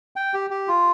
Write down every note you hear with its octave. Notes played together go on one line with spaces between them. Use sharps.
G5
G4
G4
F4